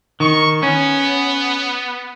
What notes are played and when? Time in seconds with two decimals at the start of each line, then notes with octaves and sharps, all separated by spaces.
0.20 D#3 C#6
0.63 B3 C#4